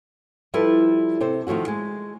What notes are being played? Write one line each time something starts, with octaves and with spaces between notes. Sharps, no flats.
F3 G3 E4 A4 B4
C3 A4 C5
D#3 F3 F#3 A3 F#4
G#3